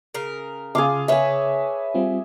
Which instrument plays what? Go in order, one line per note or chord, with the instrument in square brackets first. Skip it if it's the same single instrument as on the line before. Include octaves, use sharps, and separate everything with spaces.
[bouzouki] C#3 A#4
[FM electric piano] C#3 [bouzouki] F4 [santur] G#4 F5 D6
[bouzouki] B4 C#5 [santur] E5 G#5
[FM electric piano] G3 C4 F4